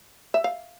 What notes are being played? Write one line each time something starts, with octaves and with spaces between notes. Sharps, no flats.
E5
F5